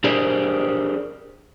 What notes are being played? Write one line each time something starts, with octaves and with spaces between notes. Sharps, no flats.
D4 G4 G#4 A#4 C5 D5